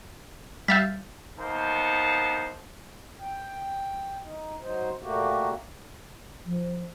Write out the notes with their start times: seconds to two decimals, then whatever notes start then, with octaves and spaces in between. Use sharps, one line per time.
0.68 G3 E5 F5 G6 A6 B6
1.38 A#3 B3 D#4 C5 A5
3.21 G5
4.23 D#4
4.62 F#3 D#4 C5
5.02 A#2 A3 A#3 F#4 G4
6.46 F3